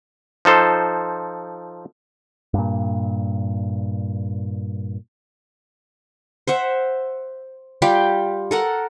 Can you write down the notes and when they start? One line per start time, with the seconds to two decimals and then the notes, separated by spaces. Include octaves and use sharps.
0.45 F3 D#4 A4 C5
2.54 G2 A#2
6.47 C5 E5 F#5
7.82 G3 F4 G4 G5
8.51 A4 A#4 F#5